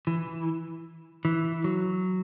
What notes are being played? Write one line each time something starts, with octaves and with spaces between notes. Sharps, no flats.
E3
E3
F#3